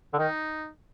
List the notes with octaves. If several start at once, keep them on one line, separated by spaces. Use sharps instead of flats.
D3
D#3 D#4